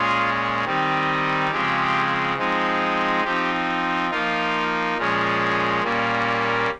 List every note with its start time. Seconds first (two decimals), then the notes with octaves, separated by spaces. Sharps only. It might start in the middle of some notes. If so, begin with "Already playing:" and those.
Already playing: A#2 G#3 C#4 F4 G#4
0.64 D#3 G3 C4 D#4
1.50 C#3 F3 G#3 C4 G4
2.38 F3 G#3 C4 D#4
3.24 F3 C4 D#4 G4
4.10 F3 A#3 D#4 F4
4.97 A#2 F3 G#3 C#4
5.84 A#2 G3 A#3 C#4